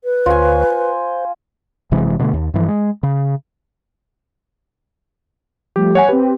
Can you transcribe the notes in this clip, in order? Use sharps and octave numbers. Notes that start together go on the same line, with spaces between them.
B4
D2 F4 C5 C#5 G#5
C5
F#1 C3 E3 G#3
B2 D3 F3 A3
D#2
G2 E3 F3
G#3
C#3
F3 G3 A3 G4
C#5 F#5 G#5
C4 G4 B4